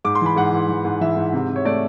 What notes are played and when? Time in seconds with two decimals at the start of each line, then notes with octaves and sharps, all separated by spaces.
0.05 G#2 D6
0.15 C6
0.21 E3 B5
0.36 G#2 F#5
0.52 E3
0.69 E3
0.85 G#2
1.01 E3 E5
1.17 G#2
1.33 C3
1.49 C3
1.56 C#5
1.65 A3 D5